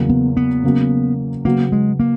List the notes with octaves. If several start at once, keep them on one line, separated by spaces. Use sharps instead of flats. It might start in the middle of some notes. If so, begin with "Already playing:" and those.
Already playing: E2 C#3 F#3 A#3
B3
B3
C#3 F#3 A#3 C#4
C#3 F#3 A#3 B3 F#4
G#3
A#3